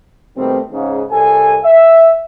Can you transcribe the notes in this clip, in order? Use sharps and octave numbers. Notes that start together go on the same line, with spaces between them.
B2 D#3 G3 A3 C4
G#2 C#3
C2 A4 G#5
E5